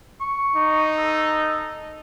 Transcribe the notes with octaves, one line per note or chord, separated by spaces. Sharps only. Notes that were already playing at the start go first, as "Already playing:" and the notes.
C#6
D#4
A4